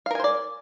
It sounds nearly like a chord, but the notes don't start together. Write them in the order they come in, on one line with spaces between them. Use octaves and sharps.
F5 A#4 G#5 C5 D5